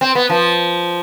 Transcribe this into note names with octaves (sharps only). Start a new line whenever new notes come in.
C4
B3
F3